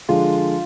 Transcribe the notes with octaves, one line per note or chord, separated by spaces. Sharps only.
D3 F3 G#3 D4 F4